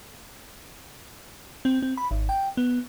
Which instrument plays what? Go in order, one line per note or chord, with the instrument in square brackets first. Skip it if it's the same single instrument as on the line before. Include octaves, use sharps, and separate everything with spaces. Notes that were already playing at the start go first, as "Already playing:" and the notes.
[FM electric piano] C4
C4
B5
G#1
G5
B3